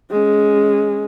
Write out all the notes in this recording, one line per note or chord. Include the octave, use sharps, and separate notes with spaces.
G#3 C#4